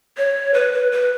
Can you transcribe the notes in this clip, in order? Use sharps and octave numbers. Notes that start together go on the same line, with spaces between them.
C#5
B4
B4
B4